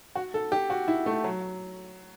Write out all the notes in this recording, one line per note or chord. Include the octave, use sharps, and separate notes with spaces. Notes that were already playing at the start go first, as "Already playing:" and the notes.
F#4
A4
G4
F#4
E4
A3
F#3